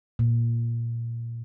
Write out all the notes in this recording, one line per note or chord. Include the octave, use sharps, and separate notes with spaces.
A#2